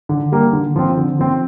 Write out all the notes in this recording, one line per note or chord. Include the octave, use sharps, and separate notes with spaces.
D3
G3 A#3
D3
F3 C4
D3
F3 C4